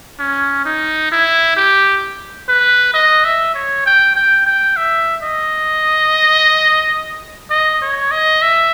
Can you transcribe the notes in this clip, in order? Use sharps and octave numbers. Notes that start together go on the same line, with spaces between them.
C#4
D#4
E4
G4
B4
D#5
E5
C#5
G5
G5
G5
E5
D#5
D#5
C#5
D#5
E5